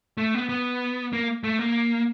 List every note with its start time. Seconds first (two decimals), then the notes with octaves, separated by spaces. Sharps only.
0.18 A3
0.34 B3
0.49 B3
1.13 A#3
1.44 A3
1.59 A#3